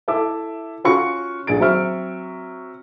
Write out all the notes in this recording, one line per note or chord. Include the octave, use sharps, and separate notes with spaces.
E4 A4 E5 D6
C#4 F4 F#4 C#6 C#7
A#1 G#4 A6 D7
F#3 C4 E5 C#6 F6